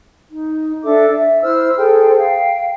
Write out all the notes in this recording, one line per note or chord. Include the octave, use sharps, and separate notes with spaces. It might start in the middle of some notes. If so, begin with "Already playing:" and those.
D#4
D4 A4 E5 D6
E5
E4 C5 E6 F6
G#4 A4 C5 G5
F5 G5